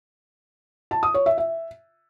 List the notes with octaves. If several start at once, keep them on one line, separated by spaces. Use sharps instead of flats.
A5
D#6
C#5
E5
E5